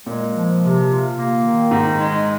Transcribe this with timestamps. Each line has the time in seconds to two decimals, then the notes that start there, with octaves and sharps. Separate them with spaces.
0.06 A#2 G#3
0.34 F3
0.61 C3
0.89 F4
1.16 A#3
1.44 D#3
1.71 G#2 D#4
1.99 G#3